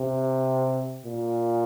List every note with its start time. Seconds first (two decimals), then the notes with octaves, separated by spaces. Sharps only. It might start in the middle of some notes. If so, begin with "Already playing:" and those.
Already playing: C3
1.06 A#2